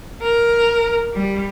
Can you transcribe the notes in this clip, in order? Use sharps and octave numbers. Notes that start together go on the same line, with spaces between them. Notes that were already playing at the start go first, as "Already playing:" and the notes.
A#4
G3